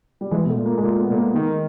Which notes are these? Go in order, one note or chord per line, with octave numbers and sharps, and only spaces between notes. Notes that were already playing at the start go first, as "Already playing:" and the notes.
G3
E3 G#3
B2 A3
A#2
A#3
G#3
A#2 A3
B3
A#2 A3
A#3
D#3 G#3